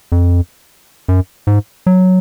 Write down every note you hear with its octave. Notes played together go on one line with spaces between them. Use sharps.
F2
F#2
G#2
F#3